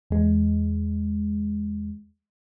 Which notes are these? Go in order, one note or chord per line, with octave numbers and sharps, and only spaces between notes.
E2 G#3